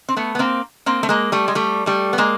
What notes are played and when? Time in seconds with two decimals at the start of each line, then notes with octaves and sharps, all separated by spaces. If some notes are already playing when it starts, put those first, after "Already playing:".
0.09 C4
0.16 A3 B3
0.35 B3
0.39 A#3 C4
0.86 A#3 C4
1.03 A3
1.09 G#3 A#3
1.32 G3 A3
1.48 G#3
1.55 G3 A3
1.86 G3 A3
2.13 B3
2.18 G#3 A#3